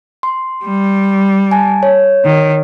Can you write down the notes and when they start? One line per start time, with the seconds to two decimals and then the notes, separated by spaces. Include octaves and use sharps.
0.23 C6
0.63 G3
1.51 G#5 A5
1.83 C#5
2.25 D#3